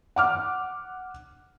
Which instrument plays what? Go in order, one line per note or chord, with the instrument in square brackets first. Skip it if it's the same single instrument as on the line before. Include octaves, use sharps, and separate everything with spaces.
[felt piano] F#5 D6 F6